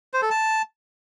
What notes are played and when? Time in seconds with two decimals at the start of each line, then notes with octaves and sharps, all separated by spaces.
0.13 C5
0.22 A4
0.30 A5